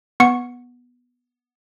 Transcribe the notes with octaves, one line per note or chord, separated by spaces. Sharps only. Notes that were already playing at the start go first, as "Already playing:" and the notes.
B3 C#6 C#7